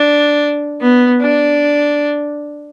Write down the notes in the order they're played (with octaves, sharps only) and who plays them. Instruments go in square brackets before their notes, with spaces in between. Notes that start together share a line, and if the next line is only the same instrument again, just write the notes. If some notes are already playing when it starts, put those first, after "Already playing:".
Already playing: [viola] D4
B3
D4